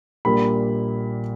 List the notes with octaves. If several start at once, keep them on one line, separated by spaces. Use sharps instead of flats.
A#1 A#2 G3 A#3 B5